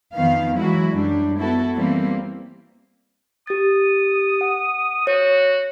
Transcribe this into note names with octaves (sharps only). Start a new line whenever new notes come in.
F2 D#3 F3 B3 F5
E3 F#3 G#3 E4 F#4
F#2 G3 D4
B3 E4 F#4 A4
E3 G3 A#3 C4
G4 D#6 A6
F#5
F#4 C#5